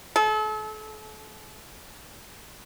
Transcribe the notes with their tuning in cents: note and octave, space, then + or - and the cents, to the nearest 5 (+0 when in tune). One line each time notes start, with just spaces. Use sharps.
A4 -35